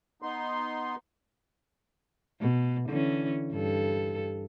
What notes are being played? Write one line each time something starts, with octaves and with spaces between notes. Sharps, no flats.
B3 D#4 C6
B2
D3 E3 C#4
G2 A4